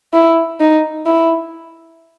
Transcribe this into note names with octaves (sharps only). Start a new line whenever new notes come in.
E4
D#4
E4